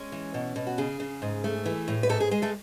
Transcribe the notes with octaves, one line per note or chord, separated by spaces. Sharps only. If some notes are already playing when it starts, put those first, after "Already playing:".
Already playing: G#3 C#4 C#5
E3
B2
B2
F#4
C#3 G#4
C#3
G#2
A3
E3
A2
B4
G#2 A3 A4
G#4
G#3 G#4
A3 A4